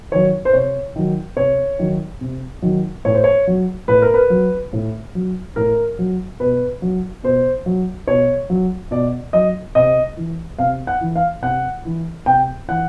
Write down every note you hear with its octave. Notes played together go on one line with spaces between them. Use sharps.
D#3 F#3 C#5
C5
C3 C#5
D#3 F#3
C3 C#5
D#3 F#3
C3
D#3 F#3
A2 C#5
C5
C#5
F#3
A2 B4
A#4
B4
F#3
A2
F#3
A2 A#4
F#3
B2 B4
F#3
B2 C5
F#3
B2 C#5
F#3
B2 D5
F#3 D#5
C3 D#5
E3
C3 F5
F#5
E3
F5
C3 F#5
E3
C3 G5
E3 F#5